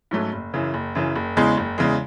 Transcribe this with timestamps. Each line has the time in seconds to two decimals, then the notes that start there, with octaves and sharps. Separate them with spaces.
0.11 G#2 F#3 A3 C#4
0.33 F#1
0.54 F#2 C#3 E3
0.74 F#1
0.95 F#2 C#3 E3
1.16 F#1
1.36 E2 C#3 E3 G#3
1.57 F#1
1.78 E2 C#3 E3 G#3